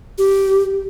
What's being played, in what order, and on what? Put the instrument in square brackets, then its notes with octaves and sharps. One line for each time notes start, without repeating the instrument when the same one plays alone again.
[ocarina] G4